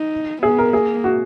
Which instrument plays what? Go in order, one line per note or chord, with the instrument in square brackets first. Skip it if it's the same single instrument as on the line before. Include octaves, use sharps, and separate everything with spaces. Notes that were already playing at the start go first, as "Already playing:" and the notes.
Already playing: [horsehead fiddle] D#4
[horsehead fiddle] B3 [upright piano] G#4
[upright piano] A#4
[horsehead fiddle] A#3 [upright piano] G#4
[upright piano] F#4